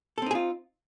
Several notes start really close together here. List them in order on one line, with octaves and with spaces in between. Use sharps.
A4 C4 D#4 G#4 F4